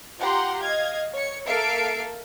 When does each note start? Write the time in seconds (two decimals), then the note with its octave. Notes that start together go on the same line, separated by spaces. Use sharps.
0.19 F4 G4 F#5 A#5 C6
0.62 D#5 F5 G#6
1.14 C#5 C#7
1.47 A#3 A4 E5 F5 C7 D7